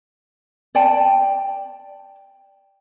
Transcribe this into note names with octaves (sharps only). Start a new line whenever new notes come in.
D5 G5 A5